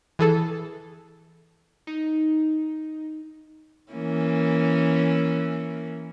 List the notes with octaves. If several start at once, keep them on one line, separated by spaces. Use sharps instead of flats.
E3 G#4 A4
D#4
E3 A#3 C#4